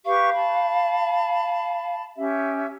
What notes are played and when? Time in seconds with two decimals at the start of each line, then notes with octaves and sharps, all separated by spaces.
0.05 G4 B4 F5 C#6
0.33 A5 B5
2.16 C#4 G4 E5